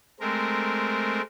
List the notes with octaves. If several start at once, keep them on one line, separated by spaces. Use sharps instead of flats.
G#3 A3 C4 A#4